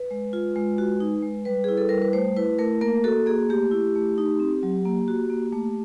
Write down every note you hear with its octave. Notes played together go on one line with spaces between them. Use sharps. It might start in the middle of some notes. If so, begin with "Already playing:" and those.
Already playing: B4
G#3
F4
G#3
F#4
D#4
G#3
G3 B4
E4 G#4
A4
G3 A#4
B4
A3 C5
E4 B4
A3 A#4
A#3 A#4
F#4 A4
A#3 G#4
A3 G4
E4
A3
D#4
C4
F#3
A#3
F#4
A#3
A3